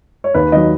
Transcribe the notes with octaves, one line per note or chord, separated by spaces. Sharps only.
C#5
D#2 B4
D#3 F#3 D#5